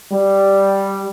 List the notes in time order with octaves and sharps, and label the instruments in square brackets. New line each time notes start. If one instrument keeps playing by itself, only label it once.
[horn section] G3